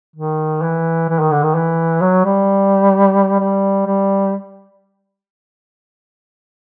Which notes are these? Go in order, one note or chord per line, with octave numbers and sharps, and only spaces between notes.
D#3
E3
E3
D#3
D3
D#3
E3
F#3
G3
G3
G3